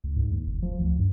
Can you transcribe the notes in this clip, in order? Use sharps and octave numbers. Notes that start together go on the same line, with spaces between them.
C#2
G#2
D#2
F#1
F3
D2
G2